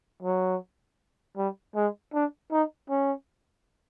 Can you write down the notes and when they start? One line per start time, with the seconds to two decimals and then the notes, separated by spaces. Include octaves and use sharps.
0.22 F#3
1.37 G3
1.75 G#3
2.13 D4
2.51 D#4
2.89 C#4